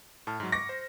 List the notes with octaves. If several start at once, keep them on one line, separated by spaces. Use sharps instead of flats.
A2 A5 F6
G#2 F#3
C#6 D6 A#6 C#7
C5